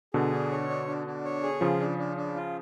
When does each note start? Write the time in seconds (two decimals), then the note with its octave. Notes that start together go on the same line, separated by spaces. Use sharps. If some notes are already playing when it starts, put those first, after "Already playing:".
0.14 B2 D3 G#4
0.33 D4
0.51 C#5
0.69 D4
0.87 D4
1.07 D4
1.25 C#5
1.43 G#4
1.61 C#3 F3 F4
1.80 D4
1.98 D4
2.17 D4
2.36 F4